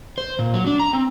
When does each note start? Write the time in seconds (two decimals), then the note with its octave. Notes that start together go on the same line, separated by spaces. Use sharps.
0.18 C5
0.39 A#2
0.54 F#3
0.67 D4
0.80 A#5
0.93 C4